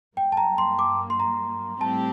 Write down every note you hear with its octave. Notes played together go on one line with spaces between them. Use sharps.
G2 F#3 A#3 G5
A5
A#5
C6
D6
C6
A#5
A2 G3 C4 G4 A5